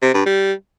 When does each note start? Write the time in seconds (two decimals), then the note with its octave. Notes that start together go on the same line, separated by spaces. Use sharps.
0.02 C3
0.14 G2
0.26 G3